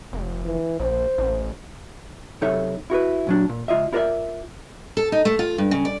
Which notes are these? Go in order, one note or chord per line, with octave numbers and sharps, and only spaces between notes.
F1
E3
A#1 C5
A1
F#2 C3 D#4 A4 C#5 E5
E4 F#4 A#4 B4
A#2 F#3 D4
A#2
C#2 F4 D#5 E5
E4 F4 A#4 C5 D5 E5
A4
D#4
A3
F4
G2
C#3
D5